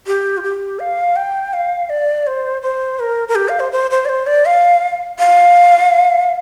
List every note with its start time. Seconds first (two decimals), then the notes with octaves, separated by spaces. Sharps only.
0.07 G4
0.37 F4
0.43 G4
0.80 F5
1.16 G5
1.53 F5
1.90 D5
2.27 C5
2.62 C5
3.00 A#4
3.28 A#4
3.35 G4
3.49 F5
3.60 C5
3.72 C5
3.91 C5
4.05 D5
4.09 C5
4.27 D5
4.46 F5
5.19 F5